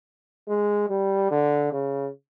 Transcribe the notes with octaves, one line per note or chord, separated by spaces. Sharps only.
G#3
G3
D3
C#3